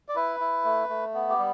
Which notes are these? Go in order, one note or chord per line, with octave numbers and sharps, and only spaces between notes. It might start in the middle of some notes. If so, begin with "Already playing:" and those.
D5
E4 B4
E4
A3
A3
B3
G4
G3